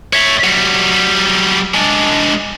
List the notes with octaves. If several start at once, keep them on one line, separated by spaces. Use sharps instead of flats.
C#5 E5
F#3 G3
G#3 D4